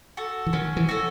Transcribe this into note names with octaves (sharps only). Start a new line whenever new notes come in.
F#4 A4
E3
D#3 C#4
E3
F#4 A4